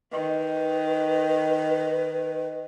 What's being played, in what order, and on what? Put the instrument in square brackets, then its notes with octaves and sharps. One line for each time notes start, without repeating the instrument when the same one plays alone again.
[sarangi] D#3 [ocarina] B4